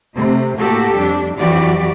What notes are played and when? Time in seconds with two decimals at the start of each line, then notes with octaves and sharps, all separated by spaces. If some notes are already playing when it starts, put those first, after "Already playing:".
0.15 C3 A3
0.59 A2 A#3 F#4 G4 A4
0.97 F2 G3 D4
1.38 F2 E3 F#3 F#4 G4 D5